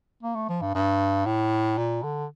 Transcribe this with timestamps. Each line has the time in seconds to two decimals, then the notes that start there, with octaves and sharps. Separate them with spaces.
0.23 A#3
0.36 A3
0.49 F3
0.62 G2
0.75 G2
1.26 A2
1.78 A#2
2.03 D3